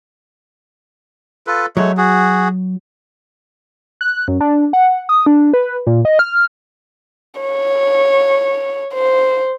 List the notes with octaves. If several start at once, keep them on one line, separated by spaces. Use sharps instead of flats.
F4 A4 B4
F#3 G#3 A3 C#5
F#4 G#4
F#6
F#2
D4
F#5
D#6
D4
B4
A#2
D#5
F6
C#5
C5